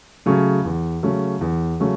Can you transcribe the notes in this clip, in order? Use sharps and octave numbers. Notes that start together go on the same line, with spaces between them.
C#3 F#3 A3 C#4
E2
C#3 F#3 A3 C#4
E2
C#3 F#3 A3 C#4